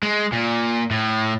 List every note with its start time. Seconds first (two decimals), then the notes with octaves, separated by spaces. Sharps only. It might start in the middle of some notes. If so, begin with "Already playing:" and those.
0.03 G#3
0.32 A#2
0.91 A2